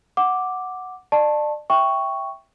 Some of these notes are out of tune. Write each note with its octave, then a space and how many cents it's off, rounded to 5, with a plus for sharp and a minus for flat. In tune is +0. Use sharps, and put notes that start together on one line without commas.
F#5 -5 D6 +0
D5 +30 A5 +0 C#6 -35
E5 +0 G5 +0 C#6 +5